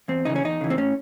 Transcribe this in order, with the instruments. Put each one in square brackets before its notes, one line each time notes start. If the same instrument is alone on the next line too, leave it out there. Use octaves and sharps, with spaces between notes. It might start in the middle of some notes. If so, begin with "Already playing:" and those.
[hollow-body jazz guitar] E2 C4
C#3 E3 D#4
C#4
E2 D#4
C#3 E3
C4
A2 C#4